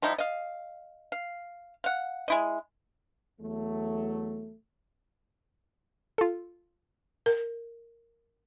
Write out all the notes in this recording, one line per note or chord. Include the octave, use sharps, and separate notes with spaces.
F3 G3 D#4 E4
D#5 F5
F5
F5 F#5
G#3 E4 D#5
E2 F#3 A3
F4 A4
A#4